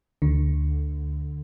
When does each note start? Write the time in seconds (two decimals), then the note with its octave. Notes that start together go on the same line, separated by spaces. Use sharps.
0.22 D2 D3